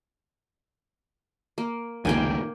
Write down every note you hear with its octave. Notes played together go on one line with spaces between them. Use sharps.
A#3
F1 C#2 D#3 A#3 G5 G#5